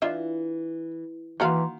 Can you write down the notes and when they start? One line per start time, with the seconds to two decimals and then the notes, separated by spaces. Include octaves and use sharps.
0.02 E3 D4 F4 E5
1.40 D#3 E3 A#3 F#4 F5 A#5 C6